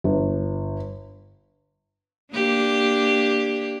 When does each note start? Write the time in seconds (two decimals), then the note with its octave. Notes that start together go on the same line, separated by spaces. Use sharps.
0.04 G1
2.33 A#3 D4 G4